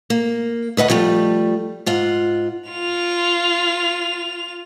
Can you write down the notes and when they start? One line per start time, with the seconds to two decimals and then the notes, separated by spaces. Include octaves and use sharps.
0.10 A#3
0.77 D2 B4 D#5 F#5
0.90 F3 G3 A3
1.86 G#2 F4 F#5
2.70 F4 F7